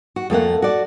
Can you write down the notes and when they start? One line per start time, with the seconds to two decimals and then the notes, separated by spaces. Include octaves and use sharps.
0.16 F#4
0.30 F2 A3 A#3 F#5
0.62 F#4 D5